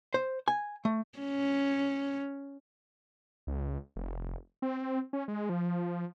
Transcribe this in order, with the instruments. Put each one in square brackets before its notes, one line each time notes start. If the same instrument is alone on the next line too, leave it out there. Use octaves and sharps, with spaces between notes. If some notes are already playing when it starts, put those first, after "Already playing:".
[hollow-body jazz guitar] C5
G#5
A3
[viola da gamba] C#4
[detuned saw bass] C#2
F1
C4
C#4
G#3
F3